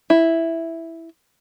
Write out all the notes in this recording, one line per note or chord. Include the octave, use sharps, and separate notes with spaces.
E4